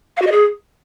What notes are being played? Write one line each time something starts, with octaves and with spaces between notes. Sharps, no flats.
F5
F#4
D#5
G#4